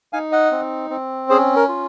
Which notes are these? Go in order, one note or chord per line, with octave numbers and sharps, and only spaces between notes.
D#4 F5 G#5
D#5 F#5
C4
C4
C#4 G#4 C5
A#4
F4